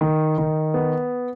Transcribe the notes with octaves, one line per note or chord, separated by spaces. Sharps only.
D#3
D#3
B3